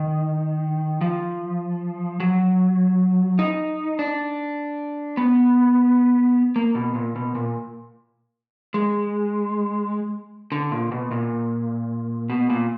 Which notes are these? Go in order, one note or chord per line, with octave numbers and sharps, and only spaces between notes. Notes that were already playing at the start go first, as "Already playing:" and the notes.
Already playing: D#3
F3
F#3
D#4
D4
B3
A#3
B2
A#2
B2
A#2
G#3
D3
A#2
B2
A#2
B2
A#2